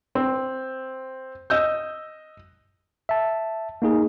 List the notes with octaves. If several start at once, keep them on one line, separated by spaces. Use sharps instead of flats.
C4
D#5 E6 G6
E5 A5
A#3 D#4 G#4